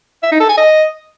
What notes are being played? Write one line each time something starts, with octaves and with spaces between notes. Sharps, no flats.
E5
D#4
A4
G#5
D#5